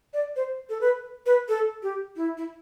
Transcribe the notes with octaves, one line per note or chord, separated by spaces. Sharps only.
D5
C5
A4
B4
B4
A4
G4
E4
E4